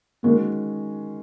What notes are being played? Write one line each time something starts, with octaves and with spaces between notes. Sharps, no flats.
D#3 G#3 A#3 C#4 F#4